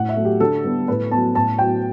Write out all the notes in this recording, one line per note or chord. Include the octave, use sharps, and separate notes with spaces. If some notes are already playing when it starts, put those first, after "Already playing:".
Already playing: A2 F#5
E5
F#3 A3
G4
D3 A4
G3 B3
A2 B4
F#3 B3 A5
A2 A5
F#3 B3 G5